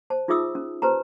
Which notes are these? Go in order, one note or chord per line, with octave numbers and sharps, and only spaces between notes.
C5 A5
D#4 F4 G#4 E5 D#6 E6
C#4
G4 B4 C5 A5 A#5